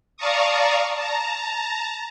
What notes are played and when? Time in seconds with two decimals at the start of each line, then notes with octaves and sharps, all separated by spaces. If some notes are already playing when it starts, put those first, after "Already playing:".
0.17 D5 F5 A5 A#5 C#6 D#6
0.95 A5 A#5